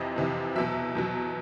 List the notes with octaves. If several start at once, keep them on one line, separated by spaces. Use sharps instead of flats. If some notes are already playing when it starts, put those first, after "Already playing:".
Already playing: F2 C3 E3 D#5
F2 C3 E3
E2 B2 F#3 E5
E2 B2 F#3